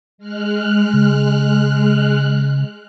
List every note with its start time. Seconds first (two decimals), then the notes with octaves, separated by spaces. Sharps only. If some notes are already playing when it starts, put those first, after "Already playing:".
0.18 G#3 F6 F#6
0.93 C#3